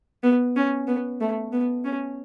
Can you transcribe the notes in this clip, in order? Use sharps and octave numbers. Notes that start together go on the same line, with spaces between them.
B3
C#4
B3
A3
B3
C#4